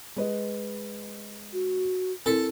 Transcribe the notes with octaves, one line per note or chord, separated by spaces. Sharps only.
G#3 B4 D#5
F#4
C4 E4 A4 A#4